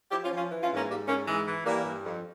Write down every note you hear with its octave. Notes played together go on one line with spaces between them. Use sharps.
F3 E4 G4
C#4 F4
F3
C#4 F4
E3
C#4 F4
G#2
A#3 C#4
G#2 G3 A#3
G#2 A#3 C#4
E3 G#3
E3
E3 G3 A#3
G2
F2